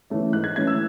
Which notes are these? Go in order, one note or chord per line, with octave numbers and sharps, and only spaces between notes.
E3 A3 C#4
G#2 F#6
G#6
E3 A3 C#4 G#6
E6